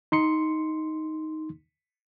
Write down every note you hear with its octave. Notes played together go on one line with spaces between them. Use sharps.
D#4 C6 C#7